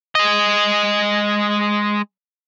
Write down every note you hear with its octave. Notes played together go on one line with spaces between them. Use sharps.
G#3 D#5